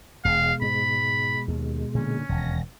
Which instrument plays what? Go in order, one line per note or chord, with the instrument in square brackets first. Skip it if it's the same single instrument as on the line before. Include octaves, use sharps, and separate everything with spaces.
[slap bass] E1 [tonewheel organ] B2 G#3 [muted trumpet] F5
[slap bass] G#2 [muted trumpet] B5
[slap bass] D#2
[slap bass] A#2 D3 [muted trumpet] C#4
[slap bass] E1 [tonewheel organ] D#2 A#6